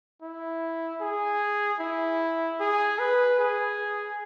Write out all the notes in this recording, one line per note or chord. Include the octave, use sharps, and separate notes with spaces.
E4
G#4
E4
G#4
B4
G#4